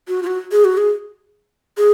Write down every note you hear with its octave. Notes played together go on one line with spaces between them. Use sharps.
F#4
F4
F#4
G#4
F#4
G#4
G#4